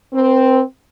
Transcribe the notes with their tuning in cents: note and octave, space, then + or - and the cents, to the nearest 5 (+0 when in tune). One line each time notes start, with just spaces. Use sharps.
C4 +0 B4 -45